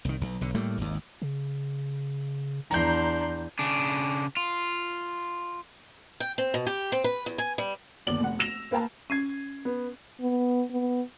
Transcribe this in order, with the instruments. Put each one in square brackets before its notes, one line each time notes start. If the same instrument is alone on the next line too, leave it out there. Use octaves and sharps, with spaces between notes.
[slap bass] C2 D#3
B1
B1 D3
A2 G3 A3 A#3
G#1 D#2
[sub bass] C#3
[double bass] E2 [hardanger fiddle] D4 C6 [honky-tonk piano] A#5 G6
[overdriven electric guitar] C#3 D4
F4
[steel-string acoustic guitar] G5
C4
B2
G4
C4
B4
E2
G#5
G3
[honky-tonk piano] G1 D#2 D5 F#7
F1 F#5
E6 A#6 E7 F7
A#3 B4 F5 G5 A5 A#5
[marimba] C#4 [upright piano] G#6 C7 D#7
[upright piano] B3
[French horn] B3
B3